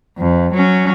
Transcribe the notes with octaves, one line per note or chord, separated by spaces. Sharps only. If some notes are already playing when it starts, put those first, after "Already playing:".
F2
F#3 C#4